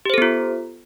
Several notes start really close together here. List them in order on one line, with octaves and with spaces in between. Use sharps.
G4 C5 A4 B3 F4